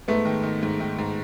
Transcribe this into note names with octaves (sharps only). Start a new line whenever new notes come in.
G#2 A3 B3
D#3
D#3
G#2
D#3
G#2